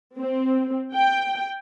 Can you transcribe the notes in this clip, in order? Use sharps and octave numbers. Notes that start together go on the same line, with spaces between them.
C4
G5